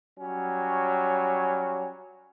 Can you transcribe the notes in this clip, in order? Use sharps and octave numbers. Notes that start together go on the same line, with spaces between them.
F#3 G3 C#4